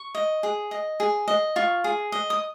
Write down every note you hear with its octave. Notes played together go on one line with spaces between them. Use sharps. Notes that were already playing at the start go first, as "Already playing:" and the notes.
Already playing: C#6
D#5
G#4
D#5
G#4
D#5
F4 C#6
G#4
D#5
D#6